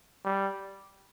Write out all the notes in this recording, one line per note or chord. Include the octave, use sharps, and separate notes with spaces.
G3